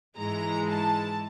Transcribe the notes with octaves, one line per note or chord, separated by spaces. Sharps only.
G#2 E3 G#3 A#5
A5